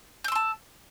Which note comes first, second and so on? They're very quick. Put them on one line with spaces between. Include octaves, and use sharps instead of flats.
G6 E6 C6 A5